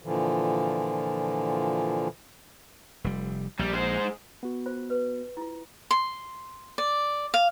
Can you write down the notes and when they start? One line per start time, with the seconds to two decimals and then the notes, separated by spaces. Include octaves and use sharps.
0.03 A#2 D3 E3 F3
3.04 F1 G3
3.59 A#1 G3
3.73 G#3 C5
4.43 B3 F#4
4.66 F4 C5
4.90 B4
5.37 E4 F4
5.91 C6
6.78 D5
7.34 F5